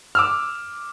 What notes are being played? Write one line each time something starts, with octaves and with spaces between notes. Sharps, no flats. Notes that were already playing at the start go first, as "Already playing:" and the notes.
D6 E6 F6